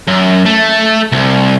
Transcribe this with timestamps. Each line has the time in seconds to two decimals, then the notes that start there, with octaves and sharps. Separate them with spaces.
0.08 F#2
0.46 A3
1.12 C2